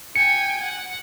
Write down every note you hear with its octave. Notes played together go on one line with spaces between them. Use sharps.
G5 G#5 C#7
F#5